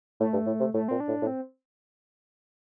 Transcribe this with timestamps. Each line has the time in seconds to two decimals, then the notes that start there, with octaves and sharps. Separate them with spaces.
0.20 A2 A3
0.33 G2
0.47 A2
0.60 C3
0.74 A2 A3
0.88 A#2 C4
1.00 D4
1.08 A2
1.22 A2
1.27 C4